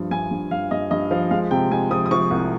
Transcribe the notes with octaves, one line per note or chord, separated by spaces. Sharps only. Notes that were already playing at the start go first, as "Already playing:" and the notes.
Already playing: G2 F3
G2 G#5
G2
G2 F5
G2 D#5
G2 D#5
F3 F5
G#3 F5
C3 G5
G#3 G#5
F3 D#6
D#6
F3 C#6
C2